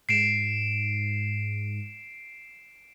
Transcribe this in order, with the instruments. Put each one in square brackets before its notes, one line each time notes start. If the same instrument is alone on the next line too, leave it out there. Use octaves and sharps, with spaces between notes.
[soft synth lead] G#2 [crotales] C7 D7 E7